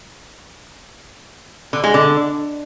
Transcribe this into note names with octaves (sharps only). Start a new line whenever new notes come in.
D3
G#3
D3